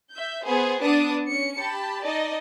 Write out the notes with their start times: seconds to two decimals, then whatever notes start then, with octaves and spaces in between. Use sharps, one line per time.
0.12 E5 G6
0.45 B3 G#4 B4 C5
0.80 B3 D4 A5 D6 D#6
1.28 C#4 C#7
1.59 G4 A5 B5
2.03 D#4 D5 D#5 A5